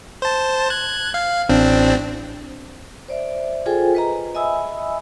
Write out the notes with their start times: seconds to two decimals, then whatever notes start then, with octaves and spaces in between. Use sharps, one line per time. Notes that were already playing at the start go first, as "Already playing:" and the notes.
0.22 C5 A5
0.70 F#6 G#6
1.14 F5
1.49 A1 C4 D4
3.08 C5 D5 E5
3.66 F4 G#4 A4 C5 G5 G#5
3.95 B4 D#5 A#5
4.35 D#5 E5 G#5 B5 D#6 E6